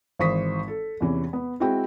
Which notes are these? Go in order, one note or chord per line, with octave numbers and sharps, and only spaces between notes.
G#1 E3 C5 C#6 D#6 B6
A4
E2 C3 E3 C#4
B3
G#3 C4 E4 F#4 G5